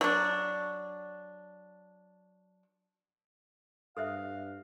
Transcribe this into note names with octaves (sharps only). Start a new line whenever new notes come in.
F#3 D4
G2 A4 C5 E5 F5